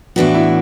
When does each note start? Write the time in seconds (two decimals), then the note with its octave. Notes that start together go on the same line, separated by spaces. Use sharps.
0.16 A2 E3 B3 D4 F#4
0.35 E4